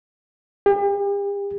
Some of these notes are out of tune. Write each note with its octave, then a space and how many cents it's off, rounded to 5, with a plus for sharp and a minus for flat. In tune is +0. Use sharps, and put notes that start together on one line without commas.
G4 +40